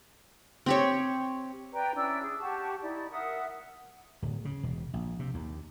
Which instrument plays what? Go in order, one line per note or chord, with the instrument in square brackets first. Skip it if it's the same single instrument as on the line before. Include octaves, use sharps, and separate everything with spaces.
[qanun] C4 G4 C#5
[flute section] B4 D5 G5 A#5
C#4 D4 E4 E6
G#4
G4 F#5 A5 C#6
D#4 E4 D5
A#4 E5 F#5 D#6
[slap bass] D1
C#3
E1
A#1
C3
D#2